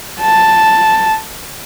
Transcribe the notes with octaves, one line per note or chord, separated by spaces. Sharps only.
A5